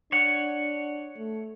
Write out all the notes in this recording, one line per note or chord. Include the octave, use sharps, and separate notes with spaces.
D4 C#5 F#5
A3